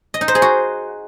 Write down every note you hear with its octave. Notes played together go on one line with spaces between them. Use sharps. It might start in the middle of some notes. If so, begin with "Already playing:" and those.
D#5
D#4
C5
G#4
F#4